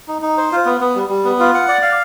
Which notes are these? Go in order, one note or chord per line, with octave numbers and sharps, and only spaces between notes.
D#4
D#4
C5
F4
B3
B3
G3
G3
B3
F4
F#5
D5
F5